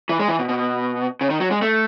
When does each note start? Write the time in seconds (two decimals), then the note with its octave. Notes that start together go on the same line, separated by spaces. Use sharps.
0.09 E3
0.20 G#3
0.29 E3
0.39 B2
0.49 B2
1.21 C#3
1.30 D#3
1.40 F#3
1.51 G#3
1.62 A3